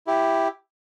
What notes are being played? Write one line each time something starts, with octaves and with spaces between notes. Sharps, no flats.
E4 G4